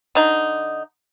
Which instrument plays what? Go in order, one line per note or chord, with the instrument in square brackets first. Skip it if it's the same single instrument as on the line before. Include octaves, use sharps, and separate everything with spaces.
[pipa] D3 D#4